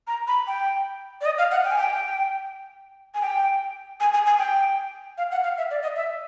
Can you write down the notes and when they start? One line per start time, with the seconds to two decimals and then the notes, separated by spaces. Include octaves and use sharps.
0.07 A#5
0.28 B5
0.47 G5
1.21 D5
1.26 D#5
1.38 F5
1.51 F#5
1.64 G5
1.71 G#5
1.78 G5
3.14 G#5
3.22 G5
4.00 G#5
4.14 G#5
4.26 G#5
4.39 G5
5.18 F5
5.31 F#5
5.44 F5
5.58 E5
5.71 D5
5.83 D#5
5.96 E5